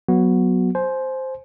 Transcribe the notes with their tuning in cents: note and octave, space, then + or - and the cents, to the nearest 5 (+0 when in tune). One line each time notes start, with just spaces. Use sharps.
F#3 -5 B3 -10 F#4 +0
C5 +0 G#5 +35